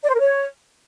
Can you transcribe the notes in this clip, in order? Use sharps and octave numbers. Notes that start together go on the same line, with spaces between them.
D5
C5
A#4
C#5